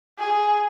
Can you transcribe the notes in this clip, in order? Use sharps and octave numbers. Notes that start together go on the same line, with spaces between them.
G#4